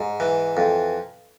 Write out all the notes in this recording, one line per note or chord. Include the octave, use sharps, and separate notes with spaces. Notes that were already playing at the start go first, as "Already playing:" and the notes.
Already playing: G#2
E3
F2